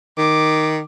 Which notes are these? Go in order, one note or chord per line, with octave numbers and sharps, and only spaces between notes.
D#3 D6